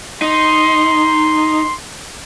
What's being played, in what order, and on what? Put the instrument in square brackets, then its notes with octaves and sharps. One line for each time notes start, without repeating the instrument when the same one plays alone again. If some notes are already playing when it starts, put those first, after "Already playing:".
[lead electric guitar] D#4 [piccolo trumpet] C6